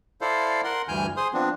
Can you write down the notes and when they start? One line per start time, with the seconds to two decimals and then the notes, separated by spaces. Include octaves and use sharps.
0.21 E4 A4 C5 D5 F5
0.64 A#4 F#5 C6
0.88 D2 G2 E3 G#5 F6 G6
1.17 G#4 C5 C6 D#6
1.34 F3 B3 C4 D4